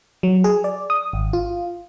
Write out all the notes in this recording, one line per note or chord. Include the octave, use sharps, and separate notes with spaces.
F#3
G#4
D5
D#6
G#1
F4